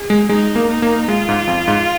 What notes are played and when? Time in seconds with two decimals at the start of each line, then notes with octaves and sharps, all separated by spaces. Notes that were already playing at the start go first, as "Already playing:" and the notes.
Already playing: G#4
0.10 G#3
0.29 G#3 D#4
0.56 A#3
0.69 D#4
0.82 A#3
1.08 G#3 F4
1.29 G#2
1.47 F2
1.67 G#2